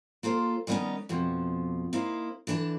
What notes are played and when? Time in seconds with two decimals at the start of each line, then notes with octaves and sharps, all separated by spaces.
0.23 A#3 F4 A4 C5
0.67 D#3 G3 A#3 B3 C#4 D#4
1.09 F2 B2 F3
1.93 A#3 D#4 E4 C5
2.47 D3 E3 D4 A4 A5